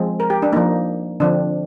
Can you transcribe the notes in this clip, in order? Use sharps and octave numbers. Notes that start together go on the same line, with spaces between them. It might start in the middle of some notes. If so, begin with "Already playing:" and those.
Already playing: F3 G#3 C4
A#4
G4
D4
F3 A#3 D#4
D3 F3 C4 D4